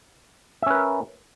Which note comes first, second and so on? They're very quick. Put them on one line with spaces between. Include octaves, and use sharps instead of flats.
E5 C#4 B4 A#4